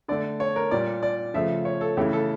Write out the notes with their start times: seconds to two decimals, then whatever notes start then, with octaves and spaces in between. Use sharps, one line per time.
0.08 D3 A3 D5
0.40 C#5
0.56 A#4
0.71 A#2 G3 D5
1.03 D5
1.34 C#3 F3 A3 E5
1.65 C#5
1.81 A4
1.97 C#3 E3 A3 G4
2.13 A4